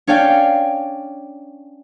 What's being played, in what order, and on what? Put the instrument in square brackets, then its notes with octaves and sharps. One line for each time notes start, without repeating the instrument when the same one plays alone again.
[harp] C#4 D4 C#5 D5 F5 G5